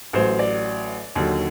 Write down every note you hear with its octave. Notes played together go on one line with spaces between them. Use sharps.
A1 A2 F#3 C5
D5
D#2 D3 F#3